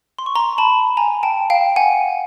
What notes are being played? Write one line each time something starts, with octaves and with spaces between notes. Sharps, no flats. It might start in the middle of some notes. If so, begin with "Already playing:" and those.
C6
C#6
A#5 C6
A5 B5
G#5 A#5
G5 A5
F5 G5
F#5 G#5